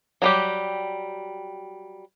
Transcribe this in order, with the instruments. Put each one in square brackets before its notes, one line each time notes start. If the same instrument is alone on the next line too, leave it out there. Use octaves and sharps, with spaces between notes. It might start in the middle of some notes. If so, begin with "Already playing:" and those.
[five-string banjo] F#3 G3 G4